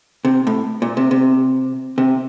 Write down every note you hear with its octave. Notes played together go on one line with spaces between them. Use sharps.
C3
A2
A#2
C3
C3
C3